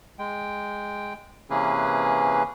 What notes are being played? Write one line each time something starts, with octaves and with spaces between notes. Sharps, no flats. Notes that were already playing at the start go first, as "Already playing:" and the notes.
G#3 G5
C3 E3 A#3 C#4 G#4 B4